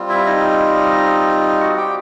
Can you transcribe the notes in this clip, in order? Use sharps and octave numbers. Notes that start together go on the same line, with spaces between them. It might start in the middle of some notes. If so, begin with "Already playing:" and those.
Already playing: G3 C4 F4
E4 E5
D#4 D#5
F#4 F#5
G4 G5